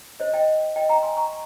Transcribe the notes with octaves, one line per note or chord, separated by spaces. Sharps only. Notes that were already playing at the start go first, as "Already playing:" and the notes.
C5 D#5
D#5 G5
D#5 G5
G5 A#5
G#5 C6
A#5 C#6